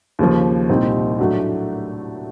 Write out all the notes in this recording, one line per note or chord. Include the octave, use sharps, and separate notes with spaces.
D#2 C#3 F3
C2 A#2 G3 C4 D#4
A2 F#3 A3 D4 F#4